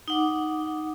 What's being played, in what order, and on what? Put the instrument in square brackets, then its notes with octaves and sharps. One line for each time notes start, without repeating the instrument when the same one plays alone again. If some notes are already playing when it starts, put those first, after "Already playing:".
[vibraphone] D#4 F#5 D6